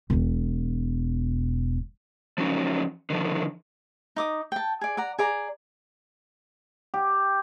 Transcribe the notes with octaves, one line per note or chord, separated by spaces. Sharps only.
E1 B2
F3 F#3 C#4 D#4
D3 D#3 F3
D#4 D6 D#6
G5 A5
G#4 D5
D5 F#5 A#5
G#4 D5 A#5
G4